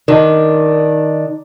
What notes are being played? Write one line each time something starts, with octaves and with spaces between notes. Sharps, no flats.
D#3 D4